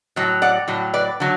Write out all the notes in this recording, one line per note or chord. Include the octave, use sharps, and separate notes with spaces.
A2 F#3
D5 F#5
A2 F#3
B4 D5
D3 F#3